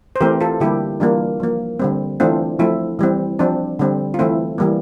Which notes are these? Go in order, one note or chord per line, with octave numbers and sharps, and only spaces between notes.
C5
E3 A3 C4 G4 A#4
F4 A4
D3 G3 A#3 E4 G4
E3 G3 A#3 D4 F4
F3 A#3
D3 G3 C4
E3 A3 C4 D4 F4
F3 A3 C4 E4
E3 G3 C4
F3 C4 D4
D3 G3 C4
F4
E3 A3 C4 E4
E3 G3 A#3